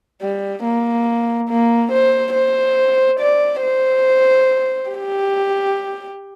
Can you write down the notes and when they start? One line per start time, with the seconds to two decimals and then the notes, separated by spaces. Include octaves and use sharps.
0.21 G3
0.64 A#3
1.49 A#3
1.92 C5
2.34 C5
3.19 D5
3.62 C5
4.90 G4